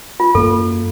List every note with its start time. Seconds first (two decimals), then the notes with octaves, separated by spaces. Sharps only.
0.20 F4
0.35 F#2 A#3 A4